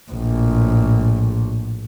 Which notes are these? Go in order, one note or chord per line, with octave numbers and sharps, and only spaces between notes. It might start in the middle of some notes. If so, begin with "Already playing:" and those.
A#1 A2